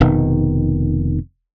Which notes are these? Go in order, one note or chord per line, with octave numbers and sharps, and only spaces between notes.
F1 B2 D#3